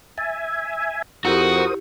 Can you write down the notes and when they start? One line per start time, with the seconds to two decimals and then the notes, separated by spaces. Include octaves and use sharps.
0.18 E5 G#5 A6
1.25 F2 E4 F#4 G4 A#4 C5 D#6